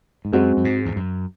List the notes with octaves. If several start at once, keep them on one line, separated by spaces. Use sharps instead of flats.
G#2
F#2 G#3 C4 F#4
F#2
G#2
E2
F#2